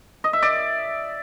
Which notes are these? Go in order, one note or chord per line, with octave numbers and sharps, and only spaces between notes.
D#5
E5
D5